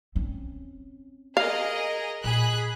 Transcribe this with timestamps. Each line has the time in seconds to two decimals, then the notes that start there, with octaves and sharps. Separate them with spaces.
0.16 C4 C#4
1.37 G#4 A#4 D#5 F5
2.24 A#2 G#4 B5 F#6